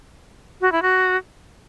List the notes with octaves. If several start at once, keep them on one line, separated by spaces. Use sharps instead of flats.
F#4
E4
F#4